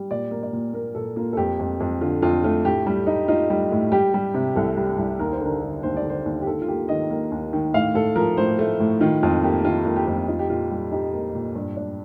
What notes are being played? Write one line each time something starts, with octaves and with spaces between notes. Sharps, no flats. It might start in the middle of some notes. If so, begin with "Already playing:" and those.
Already playing: G3
A#2 D5
A#3
D5
A#2
A#3 A#4
A#2 A4
A#3 F4
A4
F2 G4
F2
F2
D3 F4
F2 F4
A3 F4
A2 G4
G3
D#4
D#4 F4
G3
A2
G3 G4
G3
C3
C2 A4
G3
C2
D#2 A#4
C5
D3
A#4
D3
D#2 C5
D5
D3 C5
D#2
G4
D#2 A4
F4
A#3 G4
D#3 D#5
A#3
D#2
D#3
A2 F5
A2 A4
F3 A#4
A2 C5
A3
A2
D#3 F4
F2 F4
A#3 G4
D#3 F4
A#3 F4
G4
F2
D#4 F4
G4
A#2 F4
G3
D#4 G4
A#3
A#2
G2
D4